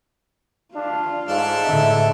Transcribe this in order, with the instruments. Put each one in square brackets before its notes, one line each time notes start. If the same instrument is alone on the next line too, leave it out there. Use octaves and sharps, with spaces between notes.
[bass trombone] D4 [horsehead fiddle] F4 F5
[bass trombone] G#2 [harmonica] D4 A4
[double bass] A2 D3 [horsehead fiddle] E5